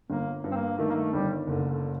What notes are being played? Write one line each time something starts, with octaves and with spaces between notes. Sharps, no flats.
G1 A#3
G2
C4
A#3
D#3 A3
A#3
A3
G1 G3
F#1 D3
D3